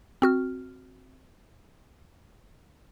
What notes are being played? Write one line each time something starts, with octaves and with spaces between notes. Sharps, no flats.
C4 F#4 F6